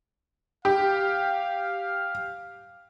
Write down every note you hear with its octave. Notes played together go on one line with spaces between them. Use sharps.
G4 F5